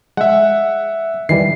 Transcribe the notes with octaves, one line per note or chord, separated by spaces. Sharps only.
G#3 E5 F#5
D#3 E3 G3 C7